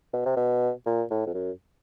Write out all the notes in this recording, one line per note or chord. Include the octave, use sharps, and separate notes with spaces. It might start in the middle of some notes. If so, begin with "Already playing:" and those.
B2
C3
B2
A#2
A2
F2
F#2